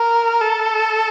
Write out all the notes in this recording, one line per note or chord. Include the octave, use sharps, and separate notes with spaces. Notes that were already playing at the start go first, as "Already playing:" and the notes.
Already playing: A#4
A4